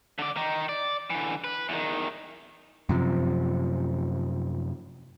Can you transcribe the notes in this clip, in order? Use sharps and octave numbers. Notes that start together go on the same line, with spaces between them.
D3 D5
D#3 D#4
D5
D3 E3
B4
E2 D#3
F#2 C3 F3